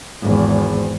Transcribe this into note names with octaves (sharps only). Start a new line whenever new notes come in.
G#1 E2